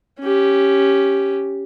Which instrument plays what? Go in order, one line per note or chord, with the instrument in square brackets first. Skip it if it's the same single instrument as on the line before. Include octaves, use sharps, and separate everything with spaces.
[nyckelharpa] C#4 G4